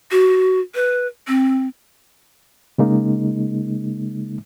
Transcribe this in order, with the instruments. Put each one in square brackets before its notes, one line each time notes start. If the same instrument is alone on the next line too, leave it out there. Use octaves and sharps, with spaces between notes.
[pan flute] F#4
B4
C4
[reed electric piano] C#3 G#3 A#3 D#4